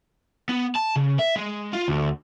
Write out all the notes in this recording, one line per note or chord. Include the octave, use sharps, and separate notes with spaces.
B3
A5
C#3
E5
G#3
F4
D2